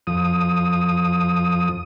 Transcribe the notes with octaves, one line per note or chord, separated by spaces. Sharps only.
F2 D#6